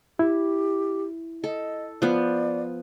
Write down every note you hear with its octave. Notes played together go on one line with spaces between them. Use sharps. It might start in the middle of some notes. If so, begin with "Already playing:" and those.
E4 G4
A4 D#5
F3 B3 D5